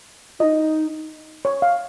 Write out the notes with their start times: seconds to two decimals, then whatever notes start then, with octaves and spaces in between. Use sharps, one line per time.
0.39 D#4 F4 D#5
1.45 C#5
1.62 F5